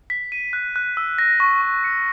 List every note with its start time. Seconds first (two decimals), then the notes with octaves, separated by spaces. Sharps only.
0.10 B6
0.32 D#7
0.53 F#6
0.76 F#6
0.97 E6
1.19 A#6
1.40 C#6
1.62 C#6
1.84 C#7